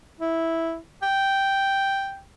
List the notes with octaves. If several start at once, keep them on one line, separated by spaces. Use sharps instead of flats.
E4
G5